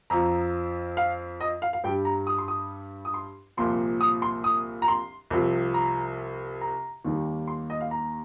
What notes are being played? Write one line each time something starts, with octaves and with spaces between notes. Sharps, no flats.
F2 F3 A#5
F5
D#5
F5
F5
G2 G3 G5
A#5
D#6
C6
D#6
D#6
C6
C2 A#2 F3 C6
D#6
C6
D#6
A#5
C6
C2 C3 F3
A#5
A#5
D#2 D#3 G3
C6
D#5
F5
A#5